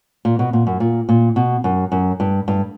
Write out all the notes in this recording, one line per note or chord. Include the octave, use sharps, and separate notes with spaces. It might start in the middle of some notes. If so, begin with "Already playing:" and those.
A#2
B2
A#2
F#2
A#2
A#2
B2
F#2
F#2
G2
G2